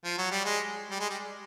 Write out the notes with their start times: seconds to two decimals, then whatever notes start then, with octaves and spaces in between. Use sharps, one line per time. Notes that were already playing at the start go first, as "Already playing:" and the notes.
0.04 F3
0.18 F#3
0.31 G3
0.45 G#3
0.90 G3
1.00 G#3
1.09 G3